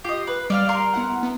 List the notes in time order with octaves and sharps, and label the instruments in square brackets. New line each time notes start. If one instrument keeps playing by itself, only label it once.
[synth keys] F4 C7 [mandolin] G4 D#5
[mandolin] B4
[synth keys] G3 [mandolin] D5 F5 F6
[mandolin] A#4 C6
[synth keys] B3 E4 F#5
B3